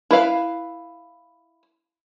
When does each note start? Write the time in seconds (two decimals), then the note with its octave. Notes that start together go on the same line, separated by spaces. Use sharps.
0.11 E4 B4 F5